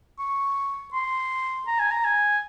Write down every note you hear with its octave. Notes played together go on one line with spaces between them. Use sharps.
C#6
C6
A#5
G#5
A#5
G#5